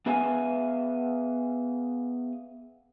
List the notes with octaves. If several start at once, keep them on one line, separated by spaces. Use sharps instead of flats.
B3 G#4 B4 E5 F5 G#5